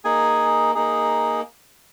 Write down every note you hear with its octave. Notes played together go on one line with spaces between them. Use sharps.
A#3 D#4 G#4 G#5
A#3 D#4 G#4